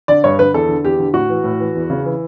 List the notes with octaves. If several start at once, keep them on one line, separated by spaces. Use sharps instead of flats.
D3 D5
G2 C#5
D3 B4
E2 A4
D3
E2 G4
D3
A2 F#4
E3
A2
E3
E2
C#3
E3